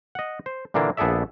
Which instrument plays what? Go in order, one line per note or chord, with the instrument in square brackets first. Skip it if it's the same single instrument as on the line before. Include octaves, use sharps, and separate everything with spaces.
[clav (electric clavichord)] D#5 F#5
C5
A#2 D3 E3 A#3 D4
A#1 B3 G#4 A4 D5 E5